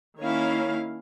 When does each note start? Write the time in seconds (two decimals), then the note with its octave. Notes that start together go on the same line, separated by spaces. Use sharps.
0.20 D#3 A#3 C#4 E4 C#5 F5